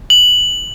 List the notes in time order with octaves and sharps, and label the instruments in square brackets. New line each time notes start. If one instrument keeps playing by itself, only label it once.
[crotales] F#7